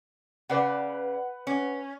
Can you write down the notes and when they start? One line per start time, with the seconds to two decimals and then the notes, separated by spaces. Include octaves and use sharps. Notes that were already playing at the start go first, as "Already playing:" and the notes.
0.49 C#3 B4 D5 F#5
1.47 C#4